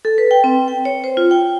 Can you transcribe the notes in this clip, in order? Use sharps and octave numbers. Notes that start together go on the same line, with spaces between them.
A4
B4
G5
C4
G5
C#5
C5
F4
G5